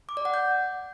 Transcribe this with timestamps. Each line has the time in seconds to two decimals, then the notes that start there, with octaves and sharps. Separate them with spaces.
0.09 D6
0.17 D5
0.25 F#5
0.34 G6